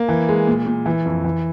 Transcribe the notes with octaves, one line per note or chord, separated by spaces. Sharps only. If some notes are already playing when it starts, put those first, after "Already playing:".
Already playing: A#3
E3
G#3
A#2
A#2
E3
F2
E3